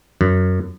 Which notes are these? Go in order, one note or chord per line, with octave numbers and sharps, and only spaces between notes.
F#2